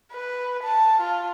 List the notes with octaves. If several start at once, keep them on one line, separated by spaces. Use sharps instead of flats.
B4
A5
F4